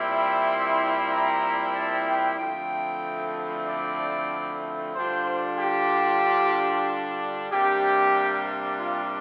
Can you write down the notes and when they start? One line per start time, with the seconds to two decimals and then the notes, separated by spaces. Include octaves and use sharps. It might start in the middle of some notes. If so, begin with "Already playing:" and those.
Already playing: A#2 G3 C4 E4
0.47 C6
1.11 A#5
1.75 A5
2.07 G5
2.39 D3 F3 A3 C4 E4 G5
3.67 D5
4.95 D3 G3 D4 F4 C5
5.59 G4
7.52 C3 G3 A#3 D4 G4
8.80 F4